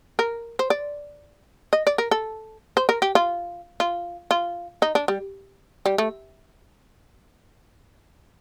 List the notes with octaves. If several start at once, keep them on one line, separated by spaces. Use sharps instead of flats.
A#4
C5
D5
D#5
D5
A#4
A4
C5
A#4
G4
F4
F4
F4
D#4
D4
G3
G3
A3